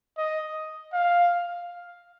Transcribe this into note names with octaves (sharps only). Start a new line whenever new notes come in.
D#5
F5